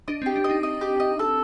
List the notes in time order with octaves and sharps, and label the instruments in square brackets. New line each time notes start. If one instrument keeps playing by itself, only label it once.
[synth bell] D4 [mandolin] D#5
[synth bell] C4 [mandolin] G4
[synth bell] D4
[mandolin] D#5
[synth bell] D#4
[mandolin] D#5
G4
D#5
A4